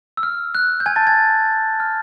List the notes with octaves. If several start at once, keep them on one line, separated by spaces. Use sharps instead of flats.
E6
F6
F#6
G6
G#5 G#6
A5 A6
G#5 G#6
F6